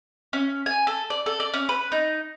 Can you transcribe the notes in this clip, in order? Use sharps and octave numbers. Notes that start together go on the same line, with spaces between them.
C#4
G#5
A4
D5
A4
D5
C#4
B4
D#4